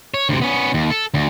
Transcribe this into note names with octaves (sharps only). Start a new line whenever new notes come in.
C#5
D2 C3
B3 C#4
D#2
A4
D2